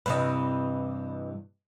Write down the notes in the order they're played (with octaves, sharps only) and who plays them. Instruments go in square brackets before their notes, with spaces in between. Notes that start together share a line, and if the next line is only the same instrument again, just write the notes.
[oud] G2 C3 E3 [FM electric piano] B4 D#5